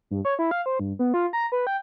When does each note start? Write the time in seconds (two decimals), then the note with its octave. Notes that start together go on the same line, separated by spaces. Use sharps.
0.11 G2
0.25 C#5
0.39 E4
0.51 F5
0.66 C5
0.80 G2
0.99 B3
1.14 F4
1.33 A#5
1.52 B4
1.67 G5